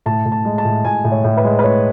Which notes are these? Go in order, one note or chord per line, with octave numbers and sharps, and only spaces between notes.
A2 A5
A2
A5
G#3
A5
A2
A2 G#5
A2
C#5
A2
B4
G#3
B4
A2 C#5